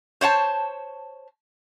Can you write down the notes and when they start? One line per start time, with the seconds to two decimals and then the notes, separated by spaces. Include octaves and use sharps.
0.21 C5 C#5 F#5 A5